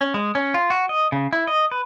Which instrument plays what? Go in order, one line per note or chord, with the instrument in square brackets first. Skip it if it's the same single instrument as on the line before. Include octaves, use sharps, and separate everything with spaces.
[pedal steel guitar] C#4
G#3
C#4
F4
F#4
D#5
C#3
E4
D#5
B4